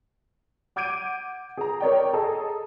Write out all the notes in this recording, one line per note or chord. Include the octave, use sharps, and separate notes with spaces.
F#5 D6 G6 G#6 D7 D#7
G#4 A#5
A#4 C#5 D5 G5
G#4 A4 D#5 A#5